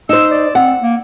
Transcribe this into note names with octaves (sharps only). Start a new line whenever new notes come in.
D#4 C5 E6
D5
C4 F#5
A#3